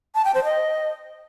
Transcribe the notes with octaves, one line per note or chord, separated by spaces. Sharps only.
A5
G5
C5
D#5